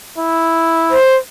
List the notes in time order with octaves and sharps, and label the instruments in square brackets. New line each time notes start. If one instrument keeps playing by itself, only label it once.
[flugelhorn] E4
[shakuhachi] C5